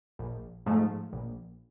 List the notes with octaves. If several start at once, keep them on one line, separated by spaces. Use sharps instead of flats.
A#1
G#2 F3 A3
A#1